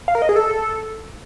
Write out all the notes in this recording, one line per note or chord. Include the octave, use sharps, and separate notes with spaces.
F5
A#4
D#5
G#4
A4